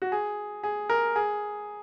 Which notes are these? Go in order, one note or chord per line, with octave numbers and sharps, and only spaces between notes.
F#4
G#4
G#4
A#4
G#4